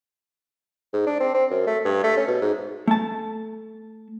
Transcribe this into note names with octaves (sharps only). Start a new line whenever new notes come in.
G#2
D4
C4
C4
F#2
A3
G2
A3
C#4
B2
G#2
A3 A5